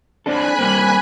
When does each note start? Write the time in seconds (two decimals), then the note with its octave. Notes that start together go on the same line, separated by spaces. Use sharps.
0.26 C4 D4 A4 G#5 B5 F#6
0.59 G3 A#3 C4